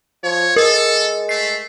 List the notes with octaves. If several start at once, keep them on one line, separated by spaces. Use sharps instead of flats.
F3 C#5
G#3 A4 A#4
A3 C7